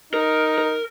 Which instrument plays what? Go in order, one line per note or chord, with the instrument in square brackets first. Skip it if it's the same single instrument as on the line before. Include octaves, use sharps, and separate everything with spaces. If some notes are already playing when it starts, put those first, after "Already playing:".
[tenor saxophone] D#4 [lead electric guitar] A#4
[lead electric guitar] A#4